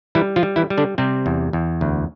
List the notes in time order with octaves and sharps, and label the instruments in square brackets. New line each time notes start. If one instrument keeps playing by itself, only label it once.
[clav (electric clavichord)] E3 G3 E4
F3 F4
G3
E3 E4
G3
D3 D4
C3 G3 C4
E2
E2
D2